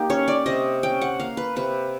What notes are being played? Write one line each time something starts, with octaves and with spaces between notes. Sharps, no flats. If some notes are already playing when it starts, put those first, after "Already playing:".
Already playing: A#3 D#4 G4
C#4 C#5
D5
C3 D#5
C#4 G5
F#5
A#3 F5
B4
C3 B4